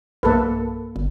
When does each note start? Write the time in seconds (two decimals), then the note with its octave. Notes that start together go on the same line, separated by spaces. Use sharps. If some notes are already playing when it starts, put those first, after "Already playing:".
0.23 B1 G2 A#3 A4 B4
0.96 G1